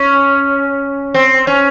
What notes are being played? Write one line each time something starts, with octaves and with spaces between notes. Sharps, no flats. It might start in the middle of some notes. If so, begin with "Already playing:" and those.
Already playing: C#4
C4
C#4